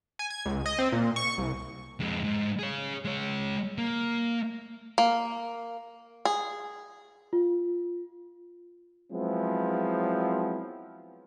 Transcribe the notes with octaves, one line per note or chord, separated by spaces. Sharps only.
G#5
G#6
C#2
D#5
C4
A#2
C#6
C2
F2 G#3
G#2
G#4 C#5
G#3 C#5
A#3
A#3
G#4
F4
F3 F#3 G#3 B3 C4 E4